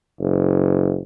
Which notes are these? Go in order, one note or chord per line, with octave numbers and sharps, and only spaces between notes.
F#1